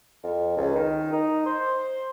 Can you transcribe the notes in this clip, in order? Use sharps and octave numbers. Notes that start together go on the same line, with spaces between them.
F2
C#2
D#3
D#4
C5